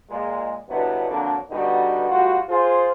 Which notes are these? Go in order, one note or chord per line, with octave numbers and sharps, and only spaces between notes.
A#2 G#3
G2 B2 D3 F#3 B3 E4
F2 D3 F#3 A#3 D4
B2 D3 G3 B3 D#4 F#4
G3 A3 F4 F#4
F4 G#4 C5